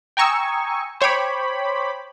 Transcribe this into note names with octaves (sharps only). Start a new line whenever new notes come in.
G5 G#5 A#5 C#6 D#6 E6
C5 C#5 G5 B5 D6